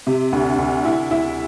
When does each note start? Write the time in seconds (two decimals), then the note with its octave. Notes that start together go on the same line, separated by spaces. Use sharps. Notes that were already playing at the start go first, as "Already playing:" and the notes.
0.07 C3
0.32 D2
0.58 D2
0.85 E4
1.11 E4